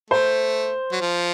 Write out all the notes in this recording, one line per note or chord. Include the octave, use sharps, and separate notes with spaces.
A3 C5
F#3
F3